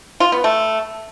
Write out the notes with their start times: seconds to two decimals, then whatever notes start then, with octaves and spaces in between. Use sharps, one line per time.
0.20 F4
0.32 B3
0.44 A3